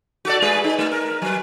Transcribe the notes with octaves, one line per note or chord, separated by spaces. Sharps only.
F#4 A4 D5
G#3 G#4 B4
D#4
A3
A#4
F#3 B4